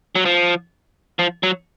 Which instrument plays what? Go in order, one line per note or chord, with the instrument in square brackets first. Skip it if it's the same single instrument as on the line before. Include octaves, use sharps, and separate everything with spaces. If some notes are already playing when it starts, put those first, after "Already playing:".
[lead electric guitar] F#3
F3
F3
F#3